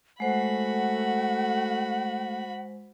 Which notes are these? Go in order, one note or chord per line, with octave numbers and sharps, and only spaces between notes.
G#3 A3 F#4 C5 F#5 B5